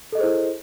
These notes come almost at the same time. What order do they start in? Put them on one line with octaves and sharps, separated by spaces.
A4 D#5 G#4 C5 E4